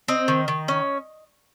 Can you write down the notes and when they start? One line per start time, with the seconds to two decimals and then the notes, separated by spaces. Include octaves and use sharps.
0.08 C4 D#5
0.28 D#3
0.48 D#3
0.68 C#4